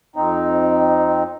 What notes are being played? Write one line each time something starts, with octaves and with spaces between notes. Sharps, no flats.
F2 C4 D#4